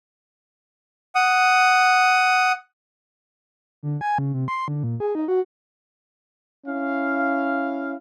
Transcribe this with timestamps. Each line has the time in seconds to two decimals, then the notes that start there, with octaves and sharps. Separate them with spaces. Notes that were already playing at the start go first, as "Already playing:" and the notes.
1.15 F#5 D#6
3.83 D3
4.01 G#5
4.18 C#3
4.34 C3
4.48 C6
4.68 D3
4.83 A#2
5.00 G#4
5.15 D#4
5.28 F#4
6.67 C#4 E4 F5